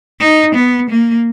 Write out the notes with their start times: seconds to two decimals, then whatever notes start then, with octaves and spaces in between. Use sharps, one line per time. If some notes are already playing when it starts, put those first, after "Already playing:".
0.20 D#4
0.55 B3
0.90 A#3